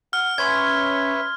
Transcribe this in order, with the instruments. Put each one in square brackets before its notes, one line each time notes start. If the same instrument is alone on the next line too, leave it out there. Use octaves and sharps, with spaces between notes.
[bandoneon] F#5 [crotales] F6
[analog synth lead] C#4 [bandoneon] B4 C#5 E5 [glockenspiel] C6 G#6